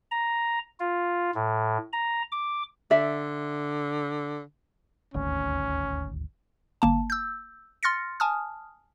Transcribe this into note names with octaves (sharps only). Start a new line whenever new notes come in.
A#5
F4
A2
A#5
D6
D3 D5 E5
D#1 G#1 D2 C#4
G1 A#3 A5
E6 G6
C6 F6 A6 A#6 C#7
G#5 A5 D#6 F6